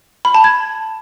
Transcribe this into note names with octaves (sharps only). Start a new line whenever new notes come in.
B5
A5
G#6